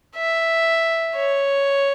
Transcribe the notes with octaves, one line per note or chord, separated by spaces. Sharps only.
E5
C#5